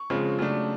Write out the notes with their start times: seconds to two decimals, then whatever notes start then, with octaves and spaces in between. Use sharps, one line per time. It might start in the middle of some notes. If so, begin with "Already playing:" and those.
Already playing: C#6
0.10 C#3 F3 G#3 C4
0.39 C#3 F#3 A3 D4